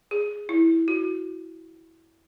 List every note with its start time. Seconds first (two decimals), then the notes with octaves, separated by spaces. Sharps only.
0.11 G#4
0.49 E4
0.88 F#4